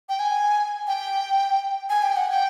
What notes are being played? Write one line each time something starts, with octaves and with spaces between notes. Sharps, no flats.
G5
G#5
G5
G#5
G5
F#5
G5